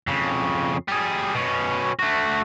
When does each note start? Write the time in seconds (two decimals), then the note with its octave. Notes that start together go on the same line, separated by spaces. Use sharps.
0.07 F2 C#3
0.88 G3 G#4
1.35 B2 C#4
1.99 A3 F#4